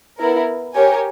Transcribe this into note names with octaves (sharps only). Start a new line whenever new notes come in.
B3 E4 A#4
G4 A#4 C#5 G#5